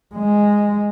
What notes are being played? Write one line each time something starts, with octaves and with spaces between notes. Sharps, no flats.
G#3